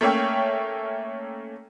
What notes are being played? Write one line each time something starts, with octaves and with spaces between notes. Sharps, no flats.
A3 A#3 C#4 C#5 E5 G5